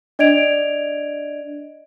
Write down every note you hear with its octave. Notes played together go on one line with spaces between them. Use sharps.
D4 D5 D#5 G#6 D7 F7